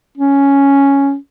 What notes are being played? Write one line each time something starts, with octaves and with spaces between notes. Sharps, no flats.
C#4